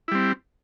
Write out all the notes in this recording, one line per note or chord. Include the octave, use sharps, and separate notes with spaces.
G3 C4 E4